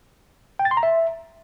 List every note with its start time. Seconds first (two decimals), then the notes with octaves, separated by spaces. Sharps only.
0.59 G5
0.65 A6
0.71 C6
0.77 A#5
0.83 E5